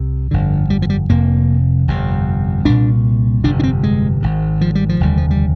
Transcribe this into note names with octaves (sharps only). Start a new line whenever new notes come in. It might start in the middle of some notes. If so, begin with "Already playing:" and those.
Already playing: C2 C3
G1 F2 D3
G3
F3
G3
F1 F2 C3 A#3
G1 F2 C3
C2 A#2 D4
G1 F2 C3 D4
D4
C4
G#3
G#1 G#2
F3
G3
F3
F1 D#2 D3 G3
F3
G3